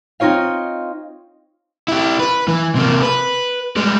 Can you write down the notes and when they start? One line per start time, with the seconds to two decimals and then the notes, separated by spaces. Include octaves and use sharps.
0.20 C4 D#4 F4 C#5 F5
1.88 E4 G4
2.20 B4
2.48 E3
2.75 C3 A#3
3.02 B4
3.76 G3 G#3